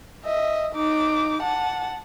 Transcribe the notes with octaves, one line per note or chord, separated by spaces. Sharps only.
D#5 E5
D#4 D6
F#5 A5